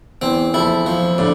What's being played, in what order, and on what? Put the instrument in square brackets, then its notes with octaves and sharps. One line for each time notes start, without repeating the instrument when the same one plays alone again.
[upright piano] E2 E3 [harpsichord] C4
[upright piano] F2 F3 [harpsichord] E4
[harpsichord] F3
[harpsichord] A2 [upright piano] D3 D4